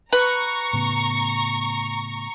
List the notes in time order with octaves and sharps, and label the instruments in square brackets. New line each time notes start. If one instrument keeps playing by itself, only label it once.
[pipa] B4 [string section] A#5 C#6
[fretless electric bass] A2 C#3 B3